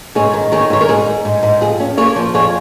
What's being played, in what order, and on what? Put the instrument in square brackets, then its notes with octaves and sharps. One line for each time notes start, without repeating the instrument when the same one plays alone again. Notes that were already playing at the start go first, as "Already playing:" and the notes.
[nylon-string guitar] G#2 G#4 C#5
D#3
D#3 G#4 C#5
G#2 C#5
A#4
G#2 G#4
G#2
G#2
G#2
F2 G#4
C#4
A#3 G#4 C#5
F3
F2 G#4 C#5